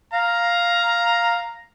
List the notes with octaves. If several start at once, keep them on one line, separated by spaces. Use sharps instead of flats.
F5 A#5